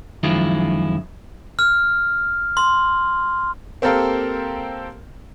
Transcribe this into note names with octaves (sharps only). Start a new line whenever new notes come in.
F#2 D#3 F3 G#3 E4 F4
F6
C6
A#3 C4 G4 A4 A#4 F5